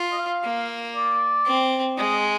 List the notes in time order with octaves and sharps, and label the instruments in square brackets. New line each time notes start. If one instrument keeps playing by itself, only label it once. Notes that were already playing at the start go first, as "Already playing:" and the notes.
Already playing: [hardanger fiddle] F4
[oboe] D#5
F5
[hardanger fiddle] A#3
[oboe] D5
[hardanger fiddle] C4
[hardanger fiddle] G#3 [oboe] D#5